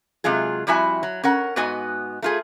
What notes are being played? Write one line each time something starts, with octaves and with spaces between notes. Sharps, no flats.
C3 F#3 G#3 F4 G#4
F2 G3 E4 F#4 E5 G#5
F#3
C#4 A#4 F#5
G#2 B3 F#4 D#5 G#5
A3 F4 G#4